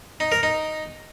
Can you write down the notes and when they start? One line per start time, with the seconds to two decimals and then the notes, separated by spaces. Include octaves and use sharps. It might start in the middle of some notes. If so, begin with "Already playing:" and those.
0.20 D#4
0.32 A#4
0.43 D#4